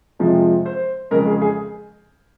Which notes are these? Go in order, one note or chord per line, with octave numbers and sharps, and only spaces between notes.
F2 C3 F3 G#3
C5
F2 C#3 G#3 A#4
G#4
G#4